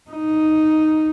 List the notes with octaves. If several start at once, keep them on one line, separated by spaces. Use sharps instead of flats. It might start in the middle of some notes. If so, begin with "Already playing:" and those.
D#4